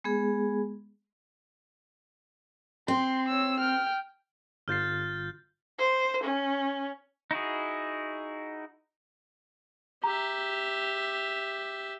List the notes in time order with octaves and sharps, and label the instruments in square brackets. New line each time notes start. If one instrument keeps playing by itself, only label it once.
[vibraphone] G#3 B3 G#4
[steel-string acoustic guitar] C4 [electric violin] C6
[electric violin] C#5 E6
G5 F6
[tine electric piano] G1 F4 C7 [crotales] F6 G6 A6
[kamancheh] C5
C#4
[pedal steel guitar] D#4 E4 F#4 G#4
[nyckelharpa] G4 E5 [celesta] A#5